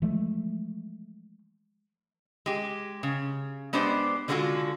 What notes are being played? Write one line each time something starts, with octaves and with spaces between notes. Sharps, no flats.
E3 F3 G#3 A3
G#3 G4
C#3
G#3 B3 D4 G4 C5 D5
D3 G#3 B3 F4 F#4 A4